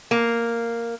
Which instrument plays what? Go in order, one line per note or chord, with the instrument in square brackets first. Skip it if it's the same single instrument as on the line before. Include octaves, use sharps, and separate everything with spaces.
[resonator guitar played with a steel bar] A#3